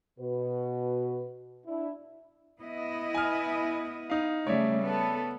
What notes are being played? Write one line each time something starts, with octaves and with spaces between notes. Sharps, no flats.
B2 F#4 B4
D4 E4
B3 E4 D#5
G#5 F6
D#4 F5
C#3 G3 A3 C#5 D5 E5
B3 A4